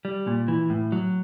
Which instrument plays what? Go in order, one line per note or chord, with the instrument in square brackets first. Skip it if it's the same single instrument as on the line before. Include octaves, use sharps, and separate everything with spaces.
[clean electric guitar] G3
A#2
E3
A2
F#3